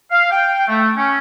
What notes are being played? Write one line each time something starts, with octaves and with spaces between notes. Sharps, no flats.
F5
G5
A3
C#4